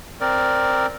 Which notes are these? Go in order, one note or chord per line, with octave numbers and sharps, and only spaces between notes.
C4 A#4 D5